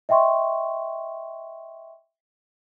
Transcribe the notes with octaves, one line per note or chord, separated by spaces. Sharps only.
D#5 E5 G5 C6 C#6